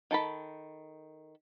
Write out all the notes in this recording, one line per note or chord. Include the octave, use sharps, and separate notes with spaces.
D#3 A4 A5 B5